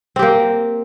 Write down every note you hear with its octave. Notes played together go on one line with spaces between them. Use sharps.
A#3 C4 G4